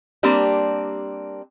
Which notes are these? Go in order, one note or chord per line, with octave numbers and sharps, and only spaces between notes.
G3 A#3 C4 D4 G4